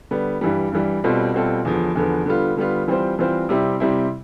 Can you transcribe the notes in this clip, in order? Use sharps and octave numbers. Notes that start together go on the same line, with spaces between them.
D3 G3 B3
G2 E3 G3
G2 E3 G3
B2 G3 C4 F4 A4
B2 G3 C4 F4 A4
E2 D3 F3 B3
E2 D3 F3 B3
D3 G3 B3 F4
D3 G3 B3 F4
E3 G3 C4 F4 C5
E3 G3 C4 F4 C5
C3 G3 C4 E4
C3 G3 C4 E4